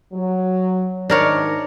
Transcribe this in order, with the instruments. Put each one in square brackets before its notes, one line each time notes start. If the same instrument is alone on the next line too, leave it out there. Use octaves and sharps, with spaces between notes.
[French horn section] F#3
[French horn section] G#2 D#3 [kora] D4 A#4 C#5